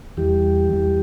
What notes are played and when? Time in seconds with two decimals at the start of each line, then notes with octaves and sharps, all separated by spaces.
0.17 E2 E3 G3 G4
0.73 E2 E3 G3